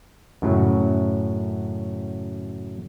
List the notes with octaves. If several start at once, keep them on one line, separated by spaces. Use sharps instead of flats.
F#2 A2 C#3 F#3